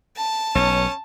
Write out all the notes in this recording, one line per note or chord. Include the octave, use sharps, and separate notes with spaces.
A5
B1 C#4